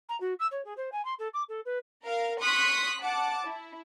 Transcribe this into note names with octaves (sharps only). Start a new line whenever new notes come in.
A#5
F#4
E6
C#5
G#4
C5
G#5
C6
A4
D6
A4
B4
A#4 F5
C6 C#6 D#6 F#6 B6
F#5 A5 D6
E4